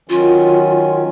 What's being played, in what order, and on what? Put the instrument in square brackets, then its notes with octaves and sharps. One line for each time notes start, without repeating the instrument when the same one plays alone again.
[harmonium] D#3 F#3 C#4 [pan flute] F4